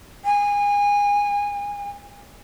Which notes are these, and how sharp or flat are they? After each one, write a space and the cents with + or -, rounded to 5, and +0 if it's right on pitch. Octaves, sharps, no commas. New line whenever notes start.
G#5 -25